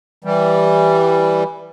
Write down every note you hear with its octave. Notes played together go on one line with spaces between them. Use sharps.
E3 G3